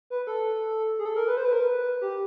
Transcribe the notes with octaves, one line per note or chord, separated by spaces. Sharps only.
B4
A4
G#4
A4
A#4
B4
C5
B4
A#4
B4
G4